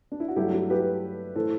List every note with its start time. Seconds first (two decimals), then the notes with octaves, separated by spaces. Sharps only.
0.12 D4
0.20 E4
0.28 F#4
0.36 G2 F#3 A3 E4 G4
0.53 E4 G4
0.70 G4 B4
1.35 A2 E3 A3 A4 C5